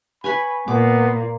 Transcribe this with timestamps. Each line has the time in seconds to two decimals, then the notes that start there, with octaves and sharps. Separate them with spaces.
0.24 B4 C#5 G#5 B5
0.68 A#2 B3 D6